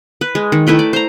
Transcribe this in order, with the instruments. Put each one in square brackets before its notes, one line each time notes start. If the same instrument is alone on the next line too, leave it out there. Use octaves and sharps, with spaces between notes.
[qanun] B4
G#3
D#3
A3 E4 B4 G5
D5
C5 A#5